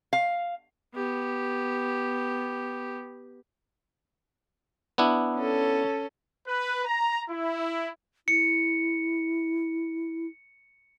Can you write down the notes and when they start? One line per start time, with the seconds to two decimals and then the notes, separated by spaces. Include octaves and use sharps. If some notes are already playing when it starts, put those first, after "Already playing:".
0.13 F5
0.94 B3 G4
4.98 B3 D4 E4
5.36 C#4 A4
6.47 B4
6.85 A#5
7.30 E4
8.28 E4 C#7